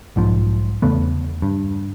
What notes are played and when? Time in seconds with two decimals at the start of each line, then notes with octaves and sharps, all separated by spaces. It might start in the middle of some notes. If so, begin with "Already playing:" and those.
0.16 B1 G#2 F3
0.82 E2 C#3 A3 B3
1.42 G2